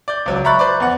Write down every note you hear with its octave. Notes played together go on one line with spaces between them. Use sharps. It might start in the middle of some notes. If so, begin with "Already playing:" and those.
D5 G6
C#2 F#3
E5 A#5 B5 C#6 F#6 A6
B4 C5 D5
E2 F#5